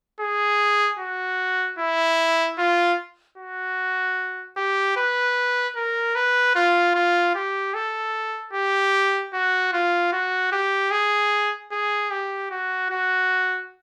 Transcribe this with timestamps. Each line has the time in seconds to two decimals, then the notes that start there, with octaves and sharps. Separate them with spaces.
0.21 G#4
0.99 F#4
1.79 E4
2.58 F4
3.38 F#4
4.57 G4
4.97 B4
5.76 A#4
6.15 B4
6.55 F4
6.95 F4
7.35 G4
7.74 A4
8.53 G4
9.33 F#4
9.73 F4
10.12 F#4
10.52 G4
10.91 G#4
11.72 G#4
12.11 G4
12.51 F#4
12.90 F#4